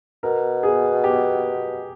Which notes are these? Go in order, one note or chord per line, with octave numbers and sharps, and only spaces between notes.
B2 A#4
G#4
G4